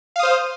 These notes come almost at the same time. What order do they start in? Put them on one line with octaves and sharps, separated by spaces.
F5 D#6 C5